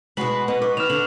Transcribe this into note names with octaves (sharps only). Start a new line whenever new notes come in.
B2 G#3 F#4 B4 F#7
B2 B3
B4 C#6 D6
D#3 F6 E7 F7
D3 F#7